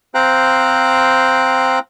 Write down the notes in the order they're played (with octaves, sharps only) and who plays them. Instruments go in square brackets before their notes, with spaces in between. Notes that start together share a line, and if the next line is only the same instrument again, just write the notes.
[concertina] C4 C5 F5 G5 A#5 F#6